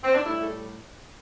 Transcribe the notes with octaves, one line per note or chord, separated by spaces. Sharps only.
C4
D4
A2 G3 E4
A4